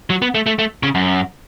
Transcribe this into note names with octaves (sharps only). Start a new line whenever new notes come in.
F#3
B3
A3
A3
A3
C#3
F#2